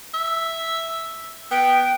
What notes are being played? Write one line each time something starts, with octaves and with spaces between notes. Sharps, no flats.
E5
B3 G5